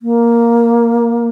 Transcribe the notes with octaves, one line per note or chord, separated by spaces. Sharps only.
A#3